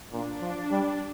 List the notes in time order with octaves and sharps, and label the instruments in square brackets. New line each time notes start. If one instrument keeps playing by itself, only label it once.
[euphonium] A#2 [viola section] D4
[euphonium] F3
G3